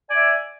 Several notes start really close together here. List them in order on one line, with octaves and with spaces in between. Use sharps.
G#5 D5 E5